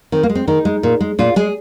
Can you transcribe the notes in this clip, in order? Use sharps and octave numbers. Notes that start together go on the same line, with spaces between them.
D#3 C4
A#3
G#3
C4
D#3 D#4
G#3
A#2
G#3
A#2 F4
G#3 G#4